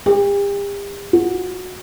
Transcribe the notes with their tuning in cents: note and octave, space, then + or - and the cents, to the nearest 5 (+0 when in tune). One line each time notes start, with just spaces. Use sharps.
G4 +40
F#4 -15